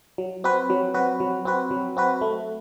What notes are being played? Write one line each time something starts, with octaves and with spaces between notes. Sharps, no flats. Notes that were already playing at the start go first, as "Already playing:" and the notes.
F#3
C4 F#4 B4
F#3
C4 F#4 B4
F#3
C4 F#4 B4
F#3
C4 F#4 B4
A3